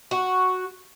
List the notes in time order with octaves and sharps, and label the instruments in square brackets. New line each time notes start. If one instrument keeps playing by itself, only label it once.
[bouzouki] F#4